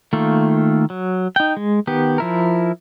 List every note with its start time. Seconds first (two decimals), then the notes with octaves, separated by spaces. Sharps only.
0.13 D#3 A3 A#3 F4
0.90 F#3
1.36 D#4 G5
1.57 G#3
1.87 D#3 B3 G4
2.18 F3 E4 A#4